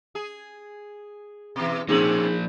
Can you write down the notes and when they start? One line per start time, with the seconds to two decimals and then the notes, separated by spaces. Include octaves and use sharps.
0.15 G#4
1.56 B2 E3
1.89 B2 F3 A#3 C4 C#4 D#4 G#4 F#7